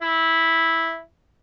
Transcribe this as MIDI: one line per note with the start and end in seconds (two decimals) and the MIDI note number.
0.02 1.00 64